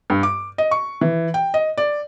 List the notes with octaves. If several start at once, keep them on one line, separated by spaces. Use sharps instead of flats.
G2
D6
D#5
C#6
E3
G5
D#5
D5